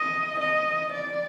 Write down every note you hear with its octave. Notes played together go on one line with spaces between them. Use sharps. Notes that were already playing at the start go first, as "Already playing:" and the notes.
Already playing: D#5
D#5
D5